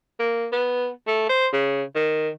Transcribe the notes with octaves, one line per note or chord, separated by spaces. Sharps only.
A#3
B3
A3
C5
C#3
D#3